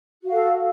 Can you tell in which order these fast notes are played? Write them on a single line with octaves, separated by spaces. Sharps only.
F#4 F5 A4